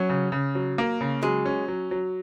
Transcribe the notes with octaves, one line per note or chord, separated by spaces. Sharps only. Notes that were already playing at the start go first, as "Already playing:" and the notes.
Already playing: F#3 C#4
C#3
C#3
F#3
A#3
C#3
F#3 G#3
C#4
F#3
F#3